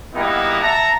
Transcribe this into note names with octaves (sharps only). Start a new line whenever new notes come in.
G3 A#3 B3 D#4 E4 F#4
E5 F#5 A5 A#5